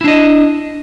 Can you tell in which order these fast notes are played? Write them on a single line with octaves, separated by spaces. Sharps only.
E4 D4 D#5